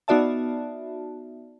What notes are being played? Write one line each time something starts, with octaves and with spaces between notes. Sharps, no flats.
B3 D#4 F#4 D5 E5 A5